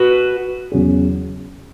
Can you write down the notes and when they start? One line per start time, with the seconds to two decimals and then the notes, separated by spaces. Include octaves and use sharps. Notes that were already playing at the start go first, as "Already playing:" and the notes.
Already playing: F#4 B4
0.72 E2 C#3 F#3 C#4 G#4